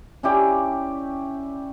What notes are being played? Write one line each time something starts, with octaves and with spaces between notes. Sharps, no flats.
C#4 E4 G4 D5